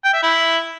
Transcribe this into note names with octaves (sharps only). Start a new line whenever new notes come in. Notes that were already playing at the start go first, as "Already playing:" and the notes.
G5
E5
E4